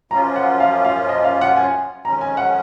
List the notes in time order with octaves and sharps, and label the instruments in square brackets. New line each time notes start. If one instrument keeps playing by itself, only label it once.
[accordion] F#2 F3 A#3 C#4 F4 [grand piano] A#5
[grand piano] F#5
F5
F5
D#5
F5
F#5
G#5
[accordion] F2 D#3 G#3 C#4 [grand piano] A#5
[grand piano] G#5
F#5